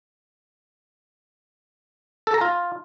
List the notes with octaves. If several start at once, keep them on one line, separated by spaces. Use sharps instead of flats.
A4
A#5
F4